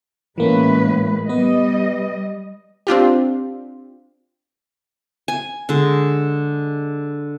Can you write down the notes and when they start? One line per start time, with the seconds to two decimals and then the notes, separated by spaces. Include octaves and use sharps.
0.38 A2 E3 G#3 A#3 C#4 B4
1.29 G3 B3 B4 D#5
2.87 C4 D4 F4 G4
5.28 G#5
5.69 D3 G#3